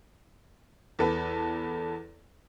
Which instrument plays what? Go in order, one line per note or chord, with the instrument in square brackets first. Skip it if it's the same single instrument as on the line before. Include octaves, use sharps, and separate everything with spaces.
[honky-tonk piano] E2 A4 B4